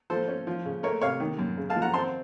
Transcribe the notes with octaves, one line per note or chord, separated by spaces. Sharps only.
F3 A4 C5
C#4
F3
C#3
A3 A#4 C#5
C3 C#5 F5
D#3
F#2
C#3
F5 A5
F3
F#5 A#5
C4 A5 C6